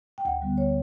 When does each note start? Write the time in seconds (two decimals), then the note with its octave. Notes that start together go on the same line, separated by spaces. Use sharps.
0.18 G5
0.25 D2 F#5
0.42 D3 G3 B3
0.58 D2 C#5